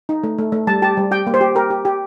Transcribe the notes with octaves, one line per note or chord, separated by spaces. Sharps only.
D#4
A3
A3
A3
G3 A5
G4 A5
G3
G4 G5
A#3
C5
G4
G4 A#4
G4
G4